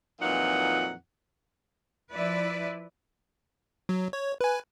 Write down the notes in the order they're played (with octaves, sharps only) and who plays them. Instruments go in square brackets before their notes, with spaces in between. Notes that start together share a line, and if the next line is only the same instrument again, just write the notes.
[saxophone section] F2 A#2 E3 F#3 D#4 F#5
[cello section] F3 E4 B4 D5
[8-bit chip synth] F#3
C#5
B4 G#5